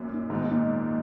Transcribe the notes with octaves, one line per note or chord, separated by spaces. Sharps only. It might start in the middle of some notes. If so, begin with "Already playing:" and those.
Already playing: F#2 A#2
A#3 D#4
G#2 B2 D#3
G#2 B2
A#2 A#3 D#4